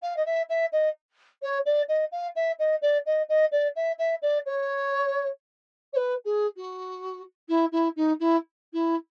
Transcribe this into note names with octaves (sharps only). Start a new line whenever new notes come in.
F5
D#5
E5
E5
D#5
C#5
D5
D#5
F5
E5
D#5
D5
D#5
D#5
D5
E5
E5
D5
C#5
C#5
B4
G#4
F#4
E4
E4
D#4
E4
E4